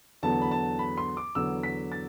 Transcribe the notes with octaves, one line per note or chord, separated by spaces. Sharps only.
E2 D3 F#3 B3 A5
B5
A5
B5
C6
D6
E2 D3 F#3 B3 E6
B6
A6